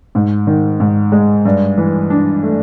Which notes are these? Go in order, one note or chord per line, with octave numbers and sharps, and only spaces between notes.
G#2
D#3
G#2
G#3
G2
E3
D4
A3